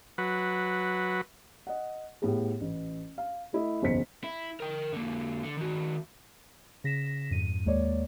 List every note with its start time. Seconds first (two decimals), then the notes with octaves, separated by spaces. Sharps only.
0.18 F#3 B4
1.67 D#5 F#5
2.22 A2 B3 G4 G#4
2.61 A1
3.18 F5
3.53 A3 E4 D#5
3.82 F#1 B1 E2 C5 B6 C#7
4.24 E4
4.60 A#4 G5
4.93 D3 A#3
5.43 D3
5.57 D#3 F#4
6.84 C#3 A#6 B6 E7
7.31 F2 G#2 D#7
7.65 D#2 G#3 A#3 C#5 D5